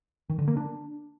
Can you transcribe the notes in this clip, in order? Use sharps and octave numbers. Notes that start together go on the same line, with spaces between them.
D#3
D3
A#3
D4